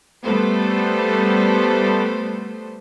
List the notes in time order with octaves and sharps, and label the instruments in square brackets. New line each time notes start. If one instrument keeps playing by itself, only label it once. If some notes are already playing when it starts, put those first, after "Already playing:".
[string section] G3 A3 B3 A4 C5